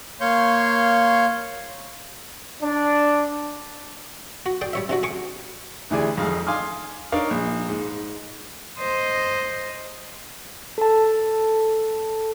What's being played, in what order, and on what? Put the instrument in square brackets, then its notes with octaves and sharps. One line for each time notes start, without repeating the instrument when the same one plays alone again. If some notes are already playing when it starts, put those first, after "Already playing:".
[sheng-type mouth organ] A#3 C#5 F5 C6 C#6 G6
[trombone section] D4
[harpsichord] F#4
G#4 D5 G5
G3 C#5 E5
C3 D4 F#4
G#4 G#5 C#6 D6
[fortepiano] D2 C3 E3 G#4 D5 G#5
G#1 F2 D#4 G#4 F5
F5 G#5 C6 D6 D#6 F6
D4 D#4 A#4 C#5 D5 F5
A#1
G#2
[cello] C5 D#5
[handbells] A4 A5